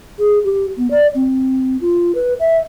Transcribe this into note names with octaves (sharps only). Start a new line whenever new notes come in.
G#4
G4
B3
D5
C4
F4
B4
E5